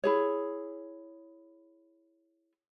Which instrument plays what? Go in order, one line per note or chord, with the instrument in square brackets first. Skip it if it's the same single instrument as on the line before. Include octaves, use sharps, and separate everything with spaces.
[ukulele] E4 G#4 C#5